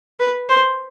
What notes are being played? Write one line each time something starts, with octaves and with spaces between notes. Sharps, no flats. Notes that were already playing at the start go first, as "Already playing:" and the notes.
B4
C5